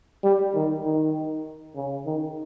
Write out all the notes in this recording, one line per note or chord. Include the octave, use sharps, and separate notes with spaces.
G3
D#3
D#3
C#3
D#3